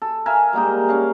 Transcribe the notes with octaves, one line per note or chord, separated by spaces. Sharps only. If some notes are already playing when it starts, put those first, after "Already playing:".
A4
A#4 E5 F5 G#5
G3 G#3 A#3 D#4
C#4 A#4 F5